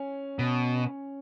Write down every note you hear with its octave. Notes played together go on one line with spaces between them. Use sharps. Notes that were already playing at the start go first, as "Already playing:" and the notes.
Already playing: C#4
B2